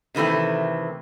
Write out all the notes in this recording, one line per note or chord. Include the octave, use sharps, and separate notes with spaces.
C3 D#3 E3 A3 C4